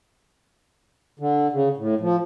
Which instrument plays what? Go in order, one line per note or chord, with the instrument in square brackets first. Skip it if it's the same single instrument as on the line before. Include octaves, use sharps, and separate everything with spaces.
[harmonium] D3
C#3
A2
F3